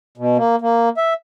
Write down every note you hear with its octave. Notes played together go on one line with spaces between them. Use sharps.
B2
A#3
A#3
E5